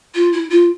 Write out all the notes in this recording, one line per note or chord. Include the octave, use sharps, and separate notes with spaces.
F4
E4
F4